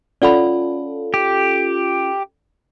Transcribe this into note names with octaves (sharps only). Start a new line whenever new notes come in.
C#4 F4 A4 D5 F#5 B5
G4